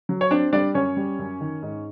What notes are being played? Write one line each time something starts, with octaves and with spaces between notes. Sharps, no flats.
F#3
C#5
C4 D4 D5
G3 D4 D5
F#2 C#4 C#5
G3
F#2
D#3
G#2